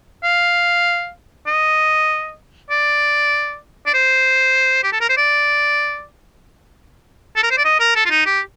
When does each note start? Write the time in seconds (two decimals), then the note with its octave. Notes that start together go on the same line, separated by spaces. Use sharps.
0.23 F5
1.47 D#5
2.70 D5
3.86 D5
3.94 C5
4.84 G4
4.92 A4
5.01 A#4
5.09 C5
5.17 D5
7.36 A4
7.43 A#4
7.50 C5
7.57 D5
7.65 D#5
7.80 A#4
7.95 A4
8.05 F4
8.10 D#4
8.26 G4